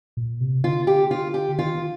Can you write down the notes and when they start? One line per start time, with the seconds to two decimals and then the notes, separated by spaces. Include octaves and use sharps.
0.17 A#2
0.40 C3
0.64 D3 F4
0.87 G4
1.11 F4
1.34 G4
1.59 D#3 F4